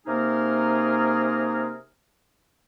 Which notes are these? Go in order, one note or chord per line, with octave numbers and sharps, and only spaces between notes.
C3 A#3 D#4 G#4 A#4 F6